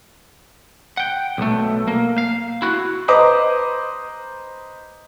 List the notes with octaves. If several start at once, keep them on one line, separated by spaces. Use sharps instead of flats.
F#5 G5
B1 A3
A#3
F5
E4 F#4
B4 C5 D#5 A#5 D6 D#6